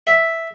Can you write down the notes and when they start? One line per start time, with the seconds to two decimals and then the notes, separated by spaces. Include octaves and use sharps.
0.07 E5